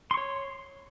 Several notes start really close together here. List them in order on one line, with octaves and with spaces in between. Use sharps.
C6 C#6 C#5